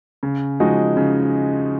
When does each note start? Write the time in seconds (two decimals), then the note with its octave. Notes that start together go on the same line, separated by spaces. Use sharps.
0.23 C#3
0.60 F3 G#3 D#4 F#4
0.97 C#3